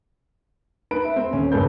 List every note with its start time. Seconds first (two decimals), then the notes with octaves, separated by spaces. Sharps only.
0.91 D#4 B4 D7
1.05 E5
1.16 C4
1.33 D#1 C#4
1.52 B1 G2 C#3 A4 B4 G6